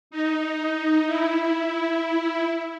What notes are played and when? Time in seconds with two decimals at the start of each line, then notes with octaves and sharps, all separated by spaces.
0.11 D#4
1.06 E4